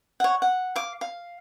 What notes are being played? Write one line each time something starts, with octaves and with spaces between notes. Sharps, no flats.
C#5 F#5
F#5
F5 D6
F5